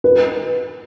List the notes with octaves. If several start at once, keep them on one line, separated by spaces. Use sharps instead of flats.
B4